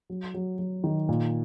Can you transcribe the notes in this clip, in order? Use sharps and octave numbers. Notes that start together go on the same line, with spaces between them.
F#3
F#3
F#3
D#3
A#2